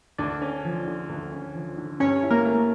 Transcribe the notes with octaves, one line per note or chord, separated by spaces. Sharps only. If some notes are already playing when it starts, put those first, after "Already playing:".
D2 D4 D5
C#4
F3
D3
D2
C#4
F3
D3
G2 C#4 C#5
E4
A#3 A#4
A3